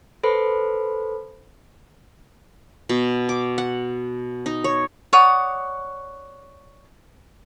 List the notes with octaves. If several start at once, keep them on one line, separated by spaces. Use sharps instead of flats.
A4 B4 C5 B5
B2
D6
F#5
D#4
C#5
C#5 D5 F#5 D#6